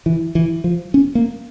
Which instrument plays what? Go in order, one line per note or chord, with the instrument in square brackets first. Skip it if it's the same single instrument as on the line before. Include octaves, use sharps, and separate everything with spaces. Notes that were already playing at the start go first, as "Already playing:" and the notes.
[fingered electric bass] E3
E3
F3
C#4
A#3